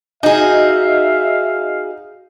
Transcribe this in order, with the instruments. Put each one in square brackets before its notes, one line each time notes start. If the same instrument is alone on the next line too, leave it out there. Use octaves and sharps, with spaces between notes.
[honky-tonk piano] D#4 [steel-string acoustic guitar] F#4 G#4 [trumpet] E5 [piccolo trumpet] F5